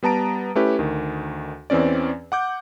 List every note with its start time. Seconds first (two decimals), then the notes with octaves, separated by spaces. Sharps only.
0.03 G3 B3 A5 A#5 D7
0.55 A3 C#4 E4 G4 B4
0.79 D2 D#3
1.70 E2 E3 C4 C#4 D5
2.32 F#5 D6 G6